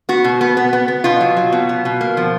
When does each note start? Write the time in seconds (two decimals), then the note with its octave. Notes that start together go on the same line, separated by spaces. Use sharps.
0.09 B3 F#4
0.24 B2
0.41 B3
0.57 B3
0.73 B3
0.88 B3
1.04 B2 F4
1.21 F#3
1.37 F#3
1.53 B2
1.69 B3
1.85 B2
2.01 A#3
2.17 F3